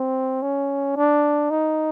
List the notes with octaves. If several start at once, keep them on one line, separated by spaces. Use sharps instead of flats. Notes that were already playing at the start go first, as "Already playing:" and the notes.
Already playing: C4
C#4
D4
D#4